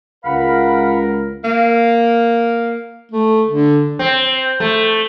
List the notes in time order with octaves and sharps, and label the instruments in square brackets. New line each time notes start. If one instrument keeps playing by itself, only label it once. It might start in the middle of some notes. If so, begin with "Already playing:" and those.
[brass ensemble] C#2 A#4 [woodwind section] F5 F#5 B5
[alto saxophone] A#3
[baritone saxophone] A3
D3
[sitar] C4
A3